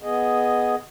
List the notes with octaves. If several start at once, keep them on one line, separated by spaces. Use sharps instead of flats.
B3 G#4 D#5